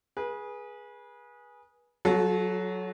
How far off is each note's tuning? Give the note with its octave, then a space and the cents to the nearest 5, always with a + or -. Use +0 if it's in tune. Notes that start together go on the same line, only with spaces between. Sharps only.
G#4 +0 B4 -30
F#3 +0 F#4 -45 A4 -30